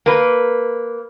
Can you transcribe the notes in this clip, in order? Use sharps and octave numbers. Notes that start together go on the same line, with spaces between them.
A#3 B4